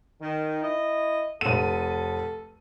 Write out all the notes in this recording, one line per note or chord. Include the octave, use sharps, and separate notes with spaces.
D#3
E4 D#5
F1 A4 D#7